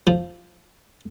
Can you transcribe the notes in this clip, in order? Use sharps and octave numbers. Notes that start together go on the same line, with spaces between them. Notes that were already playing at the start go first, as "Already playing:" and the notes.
F3